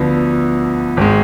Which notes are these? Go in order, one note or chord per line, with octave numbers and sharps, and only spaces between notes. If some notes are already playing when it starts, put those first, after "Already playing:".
Already playing: D2 D3 F3 B3
G#1 G#3